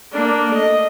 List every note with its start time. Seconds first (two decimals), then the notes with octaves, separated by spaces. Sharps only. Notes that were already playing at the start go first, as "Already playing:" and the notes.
0.12 A#3 D4
0.50 A3 D#5